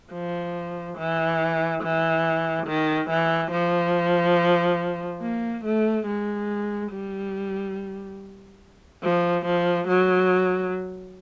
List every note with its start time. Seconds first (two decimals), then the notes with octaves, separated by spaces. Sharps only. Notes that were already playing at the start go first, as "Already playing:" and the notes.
0.13 F3
0.98 E3
1.83 E3
2.67 D#3
3.10 E3
3.52 F3
5.22 A#3
5.65 A3
6.06 G#3
6.92 G3
9.03 F3
9.46 F3
9.88 F#3